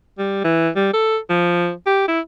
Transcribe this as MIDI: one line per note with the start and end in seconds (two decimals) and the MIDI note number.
0.18 0.40 55
0.44 0.69 52
0.76 0.90 55
0.94 1.17 69
1.29 1.72 53
1.86 2.03 67
2.08 2.20 64